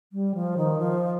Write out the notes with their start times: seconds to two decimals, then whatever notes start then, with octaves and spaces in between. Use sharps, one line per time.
0.13 G3
0.35 F3
0.57 D#3
0.79 F3